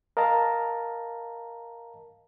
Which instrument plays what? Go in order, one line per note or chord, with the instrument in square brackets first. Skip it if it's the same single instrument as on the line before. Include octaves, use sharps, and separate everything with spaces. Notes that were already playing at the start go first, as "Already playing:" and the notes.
[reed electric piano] A#4 D#5 F5 A5 A#5